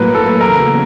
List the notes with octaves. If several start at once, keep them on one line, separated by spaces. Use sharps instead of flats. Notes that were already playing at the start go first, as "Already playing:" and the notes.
Already playing: A2 F#3 A#3 A#4 B4
A4
E2 C#3 F#3 A#4